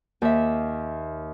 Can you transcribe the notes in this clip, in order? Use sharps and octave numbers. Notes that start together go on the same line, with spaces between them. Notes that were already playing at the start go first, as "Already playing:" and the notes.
D#2 E5